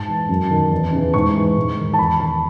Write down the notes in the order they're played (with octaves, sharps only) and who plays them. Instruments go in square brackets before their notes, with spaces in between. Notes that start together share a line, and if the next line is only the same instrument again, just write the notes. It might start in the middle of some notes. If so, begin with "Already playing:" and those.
Already playing: [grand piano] G#2 A5
E3
F#2
D#3
E2
C#3 E3
G#2 C#6
E3
G#2
D#3
A5
E2 B5
D#3 A5